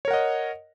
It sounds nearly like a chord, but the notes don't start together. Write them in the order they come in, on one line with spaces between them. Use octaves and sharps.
C#5 A#4 F#5 D#5